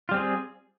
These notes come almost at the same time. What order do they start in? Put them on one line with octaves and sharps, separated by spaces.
F4 G3 C4 G#4